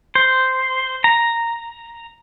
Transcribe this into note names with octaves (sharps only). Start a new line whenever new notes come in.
C5
A#5